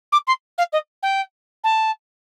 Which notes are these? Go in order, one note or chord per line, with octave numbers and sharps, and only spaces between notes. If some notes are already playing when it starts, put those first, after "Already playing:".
D6
C6
F5
D#5
G5
A5